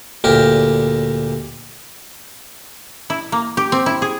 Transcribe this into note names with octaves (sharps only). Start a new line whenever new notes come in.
D2 A#2 G4 A#4
E4
A#3
G4
C4
E4
G#4